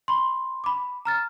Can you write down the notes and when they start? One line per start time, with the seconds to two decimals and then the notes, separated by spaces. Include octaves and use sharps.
0.08 B5 C6
0.64 B5 D6
1.05 A#5 F6 A6